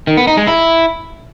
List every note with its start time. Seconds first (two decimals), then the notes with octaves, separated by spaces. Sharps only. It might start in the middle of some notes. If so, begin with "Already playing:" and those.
0.07 D#3
0.17 B3
0.27 D#4
0.37 G#3
0.47 E4